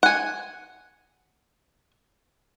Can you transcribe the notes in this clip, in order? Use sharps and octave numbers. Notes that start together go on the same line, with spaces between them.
F#5 G#5